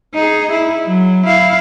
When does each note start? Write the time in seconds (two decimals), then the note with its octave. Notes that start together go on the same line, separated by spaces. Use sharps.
0.15 D#4 G#4
0.52 E4
0.87 F#3
1.26 E4 F5